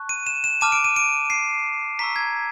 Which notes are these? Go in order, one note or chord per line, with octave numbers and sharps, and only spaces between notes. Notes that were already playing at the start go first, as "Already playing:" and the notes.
Already playing: A5 C#6 F#6
D#7
E7
E7
A5 D6 F6 D#7
D7
D#7
D7
C7
A#5 C#6 E6 B6
G#6